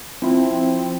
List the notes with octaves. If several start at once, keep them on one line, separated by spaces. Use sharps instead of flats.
F3 C4 E4